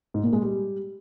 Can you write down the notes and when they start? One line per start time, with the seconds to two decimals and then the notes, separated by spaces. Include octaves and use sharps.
0.14 G#2
0.23 A#2
0.33 G#3
0.42 G3